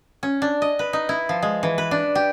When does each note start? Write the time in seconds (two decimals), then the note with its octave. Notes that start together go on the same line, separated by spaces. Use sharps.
0.23 C#4
0.42 D4
0.62 D#5
0.79 B4
0.93 D#4
1.09 E4
1.29 F3
1.42 G#3
1.63 E3
1.78 B4
1.91 D4
2.15 G4